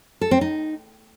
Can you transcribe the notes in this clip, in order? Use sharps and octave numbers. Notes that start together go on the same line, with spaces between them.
A4
C4
D#4